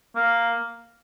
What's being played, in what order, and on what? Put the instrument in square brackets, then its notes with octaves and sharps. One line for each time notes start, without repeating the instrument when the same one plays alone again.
[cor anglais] A#3